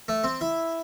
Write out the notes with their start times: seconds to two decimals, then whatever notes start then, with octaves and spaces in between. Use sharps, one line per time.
0.08 A3
0.24 C4
0.41 E4